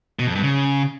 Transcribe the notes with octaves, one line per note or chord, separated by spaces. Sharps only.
B2
F2
G2
C#3